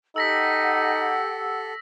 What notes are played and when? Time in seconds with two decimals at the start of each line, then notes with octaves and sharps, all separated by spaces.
0.16 D#4 G4 A4 F#5 E6 A#6 B6